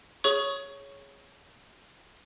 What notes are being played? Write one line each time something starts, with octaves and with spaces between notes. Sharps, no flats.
G#4 C#5 C#6